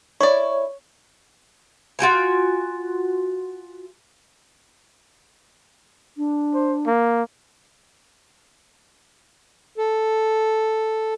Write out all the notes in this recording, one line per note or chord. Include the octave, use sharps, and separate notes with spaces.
E4 C#5 D5
F4 F#4 G5 G#5
D4
C5
A#3
A4